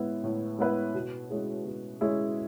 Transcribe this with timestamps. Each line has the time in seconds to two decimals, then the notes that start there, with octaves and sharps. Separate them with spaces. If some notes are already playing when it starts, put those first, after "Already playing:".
Already playing: A2 G#3 B3 E4 B4
0.23 A2
0.58 G#3 B3 E4 B4
0.94 B2
1.30 G#3 C#4 E4 G#4
1.65 B2
2.01 G#3 C#4 E4 G#4